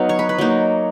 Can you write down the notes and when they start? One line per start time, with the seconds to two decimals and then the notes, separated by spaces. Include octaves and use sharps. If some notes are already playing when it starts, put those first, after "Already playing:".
Already playing: F#3 B3 D#4 F5
0.09 C#5
0.19 B4
0.29 B4
0.38 F#3 A#3 D#4